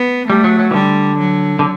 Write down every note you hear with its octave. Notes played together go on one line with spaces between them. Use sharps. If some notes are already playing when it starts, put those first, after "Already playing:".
Already playing: B3
G3 A3
F#3
F#3
E3
D3 G3
F#3
D3